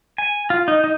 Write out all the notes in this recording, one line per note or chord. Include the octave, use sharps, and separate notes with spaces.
G#5
F4
D#4
D#4